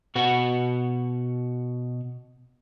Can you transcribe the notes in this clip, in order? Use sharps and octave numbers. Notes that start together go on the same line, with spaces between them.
B2 F#4 F#5